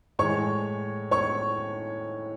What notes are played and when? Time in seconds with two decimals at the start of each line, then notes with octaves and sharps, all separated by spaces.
0.19 A2 E3 G#3 C#5 C#6
1.11 C#5 C#6